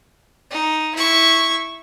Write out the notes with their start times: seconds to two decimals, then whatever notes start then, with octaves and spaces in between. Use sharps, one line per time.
0.50 D#4
0.95 E4 C#6